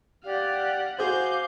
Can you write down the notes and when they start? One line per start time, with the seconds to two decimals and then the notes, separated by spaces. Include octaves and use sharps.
0.24 G4 D5 F5 F#5
0.98 F#4 G#4 C5 F5 D6 G6